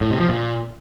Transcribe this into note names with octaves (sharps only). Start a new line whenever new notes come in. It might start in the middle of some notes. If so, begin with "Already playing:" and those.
A2
C3
F3
A#2